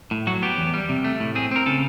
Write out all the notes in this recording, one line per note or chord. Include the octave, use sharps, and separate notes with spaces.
A2
F#3 F#4
B3 G4
E2
G3
C3
A3
A2
C4 G#4
C4 A#4
C#3 A4